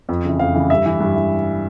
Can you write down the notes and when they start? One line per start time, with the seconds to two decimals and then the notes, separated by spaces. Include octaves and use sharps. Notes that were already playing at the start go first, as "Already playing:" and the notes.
0.09 F2
0.25 C#3 E3
0.39 F2 F5
0.54 C#3 E3
0.70 G2 E5
0.86 E3
1.00 G2
1.16 E3